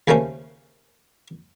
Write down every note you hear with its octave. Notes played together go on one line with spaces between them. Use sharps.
D#2 C#3 A3 A#3 C#4 C5